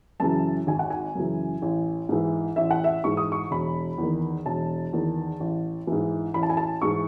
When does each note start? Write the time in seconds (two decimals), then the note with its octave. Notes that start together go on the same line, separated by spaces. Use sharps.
0.20 F#2 C#3 E3 A5
0.67 G#1 G#5
0.79 F#5
0.90 G#5
1.15 F#2 C#3 E3
1.62 A1
2.09 G#2 E3
2.56 A1 E5
2.71 F#5
2.84 E5
3.04 G#2 E3 C#6
3.17 D#6
3.32 C#6
3.51 E1 B5
3.98 E2 D#3
4.46 E1 A5
4.93 E2 D#3
5.40 A1
5.87 G#2 E3
6.34 A1 B5
6.43 A5
6.50 G#5
6.57 A5
6.82 G#2 E3 C#6